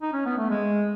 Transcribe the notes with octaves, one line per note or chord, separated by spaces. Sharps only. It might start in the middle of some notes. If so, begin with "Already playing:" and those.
D#4
C#4
B3
A3
G#3